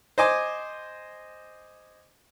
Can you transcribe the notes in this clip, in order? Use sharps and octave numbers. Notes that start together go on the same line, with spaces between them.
C5 D#5 G#5 D6